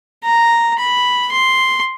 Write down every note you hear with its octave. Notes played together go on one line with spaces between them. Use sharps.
A#5
B5
C6